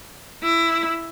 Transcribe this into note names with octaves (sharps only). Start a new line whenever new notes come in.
E4